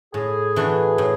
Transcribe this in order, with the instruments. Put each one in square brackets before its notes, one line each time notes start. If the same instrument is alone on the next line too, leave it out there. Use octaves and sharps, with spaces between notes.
[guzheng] A2 [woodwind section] G#4
[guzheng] E3 A3 D4 F#4
A2